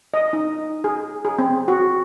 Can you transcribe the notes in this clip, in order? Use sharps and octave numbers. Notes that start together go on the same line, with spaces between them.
D#5
D#4
G#4
G#4
C4
F#4